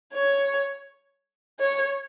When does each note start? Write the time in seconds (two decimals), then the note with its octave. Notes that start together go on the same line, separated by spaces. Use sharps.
0.13 C#5
1.60 C#5